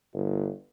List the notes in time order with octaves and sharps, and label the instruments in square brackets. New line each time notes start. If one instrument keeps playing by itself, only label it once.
[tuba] G1